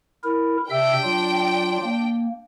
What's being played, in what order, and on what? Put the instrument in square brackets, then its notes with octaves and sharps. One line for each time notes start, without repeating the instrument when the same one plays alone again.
[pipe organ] E4 A#4
[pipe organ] C3 E5 E6 [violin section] D4 G5
[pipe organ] F#3 F4
A#3